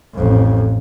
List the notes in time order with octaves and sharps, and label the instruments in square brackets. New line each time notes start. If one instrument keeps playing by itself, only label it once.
[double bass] A1 F2